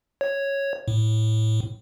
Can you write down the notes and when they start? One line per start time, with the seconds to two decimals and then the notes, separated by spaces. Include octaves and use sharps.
0.21 C#5
0.88 A2